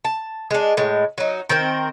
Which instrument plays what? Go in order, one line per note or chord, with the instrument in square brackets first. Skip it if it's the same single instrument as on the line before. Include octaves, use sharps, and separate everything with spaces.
[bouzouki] A5
G#3 D4
A2 G#3
F#3 D#4
D#3 C4 A#4 C5